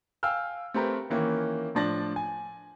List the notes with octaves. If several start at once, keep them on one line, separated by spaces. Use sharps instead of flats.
F5 G5 G#5 E6 F6
A3 C4 G4 A#4 B4
D#3 E3 A#3 C#4
A2 F3 D4 A6 A#6 F#7
G#5